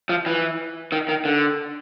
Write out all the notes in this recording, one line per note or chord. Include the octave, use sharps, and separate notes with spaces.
F3
E3
D#3
D#3
D3